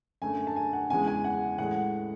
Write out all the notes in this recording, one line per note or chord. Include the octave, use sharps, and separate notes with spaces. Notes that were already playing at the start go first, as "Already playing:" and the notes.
F#2 D3 A3 G#5
A5
G#5
F#5
E2 C#3 E3 G#3 G#5
G#5
F#5
A2 E3 G#3 F#5